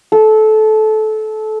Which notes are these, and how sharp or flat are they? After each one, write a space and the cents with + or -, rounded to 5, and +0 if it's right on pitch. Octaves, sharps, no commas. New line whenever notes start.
A4 -20